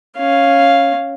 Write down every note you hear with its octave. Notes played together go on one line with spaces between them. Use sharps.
C#4 F5